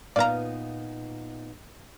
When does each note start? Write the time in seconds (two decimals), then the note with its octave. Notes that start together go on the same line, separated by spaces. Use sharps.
0.16 A#2 B3 D#4 F4 D5 F5 A#5